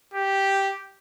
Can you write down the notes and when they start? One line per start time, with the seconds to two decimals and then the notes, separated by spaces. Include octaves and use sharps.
0.14 G4